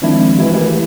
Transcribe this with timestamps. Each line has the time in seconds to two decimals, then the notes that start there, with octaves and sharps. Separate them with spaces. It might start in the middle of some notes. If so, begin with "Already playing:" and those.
0.02 D#3 F3 G#3 C4 D4 E4
0.39 E3 G#3 E4 F#4
0.54 E3 A3 E4 G4 A#4